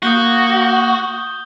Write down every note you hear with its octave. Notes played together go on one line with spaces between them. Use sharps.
A#3 F#4 D#6 G6 G7